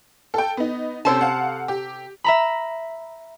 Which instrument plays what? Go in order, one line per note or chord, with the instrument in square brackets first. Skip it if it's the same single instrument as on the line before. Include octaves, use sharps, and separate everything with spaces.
[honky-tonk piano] A4 G5
B3 D#4
[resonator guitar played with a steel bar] C3 A4 A5 [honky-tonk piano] C#4 C5
[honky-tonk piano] F5 F#5
G4
[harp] E5 A#5 B5